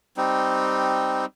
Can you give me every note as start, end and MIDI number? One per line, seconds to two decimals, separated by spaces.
0.17 1.25 55
0.17 1.25 60
0.17 1.25 63